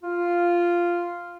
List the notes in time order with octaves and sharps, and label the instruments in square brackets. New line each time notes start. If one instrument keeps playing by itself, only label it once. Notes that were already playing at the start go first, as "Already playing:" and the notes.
[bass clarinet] F4